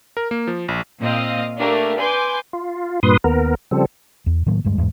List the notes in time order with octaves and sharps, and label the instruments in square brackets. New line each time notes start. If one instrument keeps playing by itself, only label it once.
[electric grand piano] A#4
A#3
F3
A#1
[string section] A#2 C4 D#5 F5
A3 A#3 D4 G4 A#4
B4 G#5 C6 D6 G6
[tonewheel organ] F4
G2 A#2 B4 C6 D#6
D#2 B3 A#4
C#3 F3 G3 C4 A4
[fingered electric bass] E2
A2 D#3 F#3 A#3
D2 G2 G3 G#3
E2 G#2